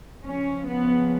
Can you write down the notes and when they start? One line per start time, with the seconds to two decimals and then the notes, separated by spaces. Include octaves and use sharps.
0.25 C#3 F3 C#4
0.68 B3